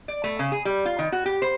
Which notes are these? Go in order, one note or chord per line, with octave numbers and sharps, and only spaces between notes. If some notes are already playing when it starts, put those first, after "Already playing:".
D5
A3
C#3
G#4
G3
F4
D#3
F#4
G4
C5